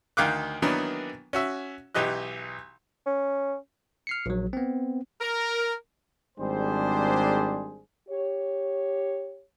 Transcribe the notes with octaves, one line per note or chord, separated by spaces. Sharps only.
D2 D#3 F5 G5 D6 F#6
D#3 E3 F#3 A#3 B3 D4
C#4 F#4 E5
B1 E3 G4 D#5 F#6
C#4
F6 C7 C#7
A#1 F#3
B3 C4
A#4
G#1 G3 D4 G#4 C5
G4 C#5